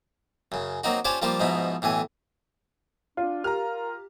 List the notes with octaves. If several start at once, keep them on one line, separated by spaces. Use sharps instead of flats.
F#2 C#3
F#3 A#3 C4 D#4 F#4
C#4 D4 F4 G4 C5 C#5
F3 G3 A#3 F4 G4 C5
G#2 B2 F3 D#4 E4
B1 A2 E3 G#5
D4 F4
G4 A#4 A#5 F6